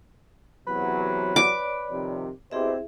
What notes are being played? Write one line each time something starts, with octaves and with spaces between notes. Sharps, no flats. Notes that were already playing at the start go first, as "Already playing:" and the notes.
E2 C3 F#3 B4
C#5 D5 D6
C3 D#3 F3
B2 C4 E4 G4 G#4 C5 E5